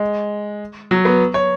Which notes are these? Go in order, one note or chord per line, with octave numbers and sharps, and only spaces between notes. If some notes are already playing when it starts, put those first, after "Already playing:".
Already playing: G#3
F#3
B3
C#5